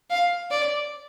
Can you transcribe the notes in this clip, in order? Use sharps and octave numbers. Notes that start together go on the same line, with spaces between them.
F5
D5